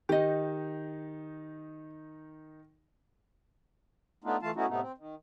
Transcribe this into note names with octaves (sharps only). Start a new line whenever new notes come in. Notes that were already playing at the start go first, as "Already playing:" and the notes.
D#3 D#4 G4 D#5
A3 B3 D4 D#4 F4
E3 A3 F4 F5 A5
A3 B3 C#4 D#4 E4 F#4
A2 C3 A3 B3 D#4
C4
D#3